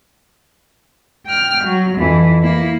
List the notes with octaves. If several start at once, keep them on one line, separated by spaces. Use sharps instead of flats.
G5 F6
F#3
F2 E3
A#3 E4